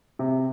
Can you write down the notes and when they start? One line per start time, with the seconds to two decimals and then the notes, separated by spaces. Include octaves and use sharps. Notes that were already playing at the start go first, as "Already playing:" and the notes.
0.19 C3